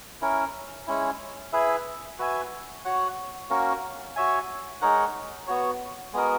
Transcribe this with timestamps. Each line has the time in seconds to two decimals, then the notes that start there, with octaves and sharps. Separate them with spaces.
0.22 C#4 E4 A#4
0.87 G#3 C#4 E4
1.53 E4 G#4 B4 E5
2.19 F#4 B4 E5 G#5
2.85 F#4 C#5 F#5
3.50 A#3 C#4 F#4 A#4
4.16 F#4 C#5 E5 G#5
4.81 G#3 D#4 A#4 C#5 F#5
5.47 B3 F#4 C#5
6.13 G#3 B3 F#4 A#4 D#5